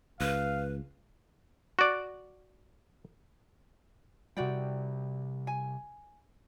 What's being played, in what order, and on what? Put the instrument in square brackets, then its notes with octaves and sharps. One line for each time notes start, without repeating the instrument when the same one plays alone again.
[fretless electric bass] C#2 [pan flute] B4 [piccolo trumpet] F5
[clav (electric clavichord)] F#4 D5
[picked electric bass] C3 G3 [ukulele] F#4 D5 G5
[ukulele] G#5